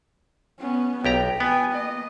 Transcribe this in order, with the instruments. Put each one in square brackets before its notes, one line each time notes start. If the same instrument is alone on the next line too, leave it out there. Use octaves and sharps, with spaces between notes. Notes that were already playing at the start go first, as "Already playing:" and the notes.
[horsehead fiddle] B3 C#4
[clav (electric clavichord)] B1 G4 A#5 [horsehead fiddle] G5
[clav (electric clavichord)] B3 [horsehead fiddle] G5 G#5
[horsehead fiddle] A#3 D#5